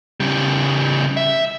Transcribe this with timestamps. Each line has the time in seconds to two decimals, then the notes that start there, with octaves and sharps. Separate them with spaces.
0.20 C#3 G3
1.17 E5